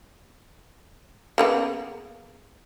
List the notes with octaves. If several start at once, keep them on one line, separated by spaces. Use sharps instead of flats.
C#3 A#3 B3